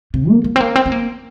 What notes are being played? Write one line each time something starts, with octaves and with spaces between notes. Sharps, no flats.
C3
A#3
A#3
C4
A#3
C4
C4
A#3